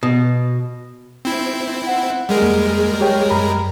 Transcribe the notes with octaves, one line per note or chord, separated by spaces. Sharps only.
B2
C4 E4
F#5
G3 G#3 G#4 A#4
F2 A#3
G4 C#5 G5
F#2 A#5 B5